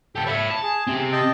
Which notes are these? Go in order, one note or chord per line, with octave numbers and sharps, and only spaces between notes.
B3 G4 A4
C#5 E5 B5
A5
G#4
C4 G4
D#5 G5 A5